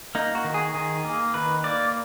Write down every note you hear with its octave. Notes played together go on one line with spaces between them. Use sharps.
A#3 D#4
F#4
D#3
G#4
D#3 G#4
A#3
D#3 B4
A#3 D5